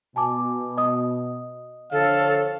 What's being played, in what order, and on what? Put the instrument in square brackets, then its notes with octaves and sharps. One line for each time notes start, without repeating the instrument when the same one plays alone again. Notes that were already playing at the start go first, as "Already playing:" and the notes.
[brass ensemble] B2 [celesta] G#5 A5 D6
[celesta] D#5 D#6
[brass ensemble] D3 F3 C#5 [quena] A4 [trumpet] F5